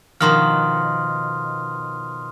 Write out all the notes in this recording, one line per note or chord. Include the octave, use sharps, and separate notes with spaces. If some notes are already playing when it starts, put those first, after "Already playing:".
B2 D#3 F3 C6 D#6 F6